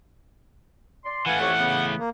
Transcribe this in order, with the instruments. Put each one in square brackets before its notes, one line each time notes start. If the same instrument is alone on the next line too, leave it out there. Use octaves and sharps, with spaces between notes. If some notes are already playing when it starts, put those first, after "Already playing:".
[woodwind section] D5 C6
[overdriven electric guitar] E3 A3 [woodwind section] B4 F5 G#5 [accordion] F#5
[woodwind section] F2 G4 C#5
C#3 B3
[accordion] A#3